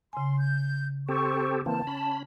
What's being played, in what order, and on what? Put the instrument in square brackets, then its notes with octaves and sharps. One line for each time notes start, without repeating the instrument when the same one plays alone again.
[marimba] C#3 G#5 [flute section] C6
[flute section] G6
[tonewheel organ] C4 G4 A4 [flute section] C5 C#6
[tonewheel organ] E3 A#3 C4 [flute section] A5
[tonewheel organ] C#4 B5